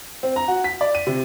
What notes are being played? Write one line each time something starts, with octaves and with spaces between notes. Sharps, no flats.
C4
A#5
F#4
B6
D5
D#7
C3